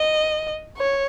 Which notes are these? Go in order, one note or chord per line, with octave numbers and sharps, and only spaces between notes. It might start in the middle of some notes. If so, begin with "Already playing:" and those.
Already playing: D#5
C#5